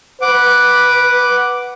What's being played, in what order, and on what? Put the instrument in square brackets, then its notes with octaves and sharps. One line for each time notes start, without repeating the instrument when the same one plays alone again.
[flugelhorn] B4 [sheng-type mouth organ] F#5 D6